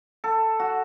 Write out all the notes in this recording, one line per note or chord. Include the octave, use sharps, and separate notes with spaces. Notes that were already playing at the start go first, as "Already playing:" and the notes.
A4
F#4